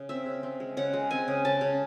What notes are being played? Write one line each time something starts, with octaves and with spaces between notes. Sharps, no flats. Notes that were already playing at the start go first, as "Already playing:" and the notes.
Already playing: C#3
C4 E5
C#3
C4
G#3
C#3 F#5
G#3
C4 G#5
C#3
C#3 A5
C#3